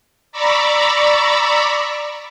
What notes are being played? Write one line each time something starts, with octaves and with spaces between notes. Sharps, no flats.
D5 A#5 B5 C#6 D6 E6